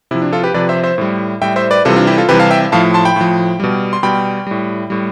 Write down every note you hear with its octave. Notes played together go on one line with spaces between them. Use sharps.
C3 F3 E4
D4
F4 A4
G4 B4
C3 F3 B4 D5
C5 E5
C5 E5
A2 G3
A2 G3 E5 G5
C5 E5
B4 D5
C3 E3 G3 F4 A4
D4 F4
E4 G4
F4 A4
C3 E3 G3 G4 B4
F5 A5
E5 G5
A2 F3 F5 A5
A5 C6
G5 B5
A2 F3
B2 G3
C6
B2 G3 G5 B5
A2 G3
A2 G3